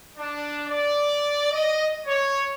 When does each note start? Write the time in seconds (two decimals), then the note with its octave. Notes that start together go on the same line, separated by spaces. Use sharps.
0.17 D4
0.67 D5
1.52 D#5
2.07 C#5